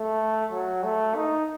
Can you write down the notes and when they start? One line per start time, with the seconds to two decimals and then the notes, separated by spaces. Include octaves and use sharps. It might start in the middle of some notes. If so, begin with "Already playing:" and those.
Already playing: A3
0.52 F#3
0.83 A3
1.15 D#4